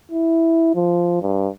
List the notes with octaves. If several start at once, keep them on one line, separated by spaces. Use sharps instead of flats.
E4
F3
G2